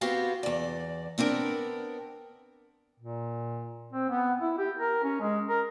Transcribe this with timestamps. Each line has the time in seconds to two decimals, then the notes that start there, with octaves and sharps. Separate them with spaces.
0.01 B3 C4 F#4 G4 F5
0.43 E2 D5
1.18 B3 C4 D4 A#4
3.00 A#2
3.93 C4
4.10 B3
4.41 E4
4.58 G4
4.79 A#4
5.03 C#4
5.21 G#3
5.49 A#4